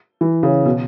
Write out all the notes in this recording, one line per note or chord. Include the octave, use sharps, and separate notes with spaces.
E3
C#3
B2